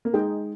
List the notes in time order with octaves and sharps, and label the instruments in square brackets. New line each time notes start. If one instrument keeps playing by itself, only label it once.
[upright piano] A#3
[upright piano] G#3 [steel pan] D#4 G#4 D#5 G5